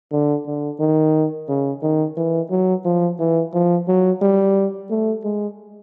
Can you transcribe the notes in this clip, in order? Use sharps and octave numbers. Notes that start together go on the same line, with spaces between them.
D3
D3
D#3
C#3
D#3
E3
F#3
F3
E3
F3
F#3
G3
A3
G#3